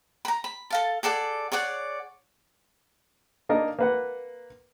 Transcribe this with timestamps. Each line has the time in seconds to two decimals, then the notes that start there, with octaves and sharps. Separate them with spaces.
0.25 A#5 B5
0.44 B5
0.70 A4 F5 A5
1.03 G#4 A4 D5 F#5
1.52 G#4 C#5 D5 F#5
3.49 A#3 D4 D#4 A#4
3.79 A#3 B4 F#5